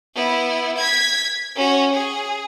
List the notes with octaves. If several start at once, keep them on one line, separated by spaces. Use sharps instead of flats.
B3 E4
G#6 B6
C#4 F#4
G#4